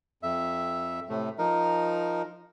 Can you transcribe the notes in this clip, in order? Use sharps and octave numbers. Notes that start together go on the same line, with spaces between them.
F2 E5
A2 C3 A3
F3 D#4 A#4